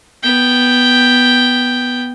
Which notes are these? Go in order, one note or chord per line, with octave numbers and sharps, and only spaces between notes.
B3 G5